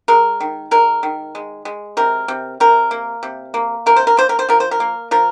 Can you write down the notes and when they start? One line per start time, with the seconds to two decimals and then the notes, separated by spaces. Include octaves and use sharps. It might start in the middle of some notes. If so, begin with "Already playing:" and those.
0.08 G#3 A#4
0.40 D#3
0.71 G#3 A#4
1.03 D#3
1.35 G#3
1.65 G#3
1.97 C3 A#4
2.28 C3
2.60 C3 A#4
2.91 A#3
3.23 C3
3.54 A#3
3.86 C3 A#4
3.96 C5
4.07 A#4
4.17 A#3 C5
4.29 A#4
4.39 C5
4.49 F3 A#4
4.60 C5
4.71 A#4
4.80 A#3
5.11 F3 A#4